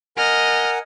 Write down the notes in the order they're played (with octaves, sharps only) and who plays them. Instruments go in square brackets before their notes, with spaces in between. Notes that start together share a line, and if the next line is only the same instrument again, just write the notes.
[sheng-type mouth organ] A#4 F#5 G#5 [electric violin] D#5 F6